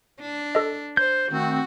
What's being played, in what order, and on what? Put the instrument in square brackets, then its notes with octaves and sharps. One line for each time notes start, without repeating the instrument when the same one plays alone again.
[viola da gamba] D4
[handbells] A4 D#5
[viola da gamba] C5 [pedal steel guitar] G6
[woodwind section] D#3 A3 C4 [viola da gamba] F#4